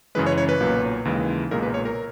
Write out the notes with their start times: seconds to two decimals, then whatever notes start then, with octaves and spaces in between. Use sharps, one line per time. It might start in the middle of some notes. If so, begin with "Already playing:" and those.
0.15 F#2 C#3 E3 G#3 B4
0.26 C#5
0.38 C#5
0.49 B4
0.60 B1 A#2 F#3
1.05 D#2 C#3 E3 G#3
1.51 B1 A#2 G#3 A#4
1.63 B4
1.74 C#5
1.85 A#4